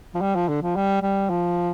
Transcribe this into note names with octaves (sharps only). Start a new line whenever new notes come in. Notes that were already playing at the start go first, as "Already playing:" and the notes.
F3
G3
F3
D3
F3
G3
G3
F3